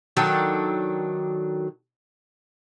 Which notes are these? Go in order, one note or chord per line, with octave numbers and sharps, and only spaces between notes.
D#3 F#3 D4 A4